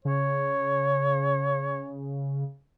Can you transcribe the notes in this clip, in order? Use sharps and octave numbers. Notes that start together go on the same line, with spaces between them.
C#3 C#5